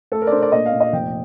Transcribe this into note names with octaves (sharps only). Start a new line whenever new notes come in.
A3 A4
A#4
D5
D4 C5
D5
A#2 D#5
F5
A#2
D#5
F1 G5